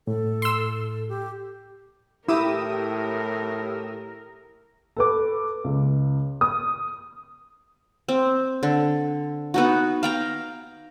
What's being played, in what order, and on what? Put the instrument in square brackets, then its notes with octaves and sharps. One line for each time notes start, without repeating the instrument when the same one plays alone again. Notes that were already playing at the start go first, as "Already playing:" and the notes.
[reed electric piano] A2 [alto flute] A4
[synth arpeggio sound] C6 E6
[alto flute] G4
[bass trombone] A2 [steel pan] E4 [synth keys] G4 D#6 E6 [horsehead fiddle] A#4
[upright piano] A4 B4 D6
C#2
D#6
[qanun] C4
D3
B3 D#4 F#4
F5 G5 A#5